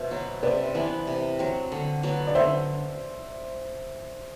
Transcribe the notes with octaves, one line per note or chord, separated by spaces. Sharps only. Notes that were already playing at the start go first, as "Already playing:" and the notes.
Already playing: B2 C5 E5
F#3 B3
C3 B4 D5
E3 B3 D4
C3
F#3 C4
D3
F#3 B3
D5
D3 C5 E5